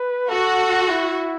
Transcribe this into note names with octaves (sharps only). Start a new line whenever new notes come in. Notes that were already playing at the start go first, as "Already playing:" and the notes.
Already playing: B4
F#4 A4
E4